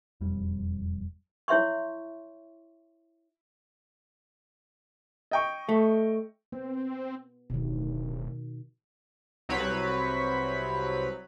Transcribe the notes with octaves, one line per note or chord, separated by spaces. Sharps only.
E1 F2 G3
E4 C#5 E5 C6 C#6
D#5 G5 C#6
A3
B3 C4
D1 B2 D#3
C2 F#3 C4 B4 C#5 B5